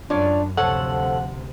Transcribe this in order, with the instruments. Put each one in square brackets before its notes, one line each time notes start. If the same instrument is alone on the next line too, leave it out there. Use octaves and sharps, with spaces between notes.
[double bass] F#2 [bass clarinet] D4 [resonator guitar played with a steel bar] F4 C#5 D5
[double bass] D2 C3 [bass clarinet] F3 [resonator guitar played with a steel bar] A4 C#5 [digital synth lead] F#5